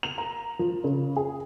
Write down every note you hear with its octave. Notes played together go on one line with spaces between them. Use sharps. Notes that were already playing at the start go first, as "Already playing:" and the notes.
F7
A#5
F3
C#3
G#4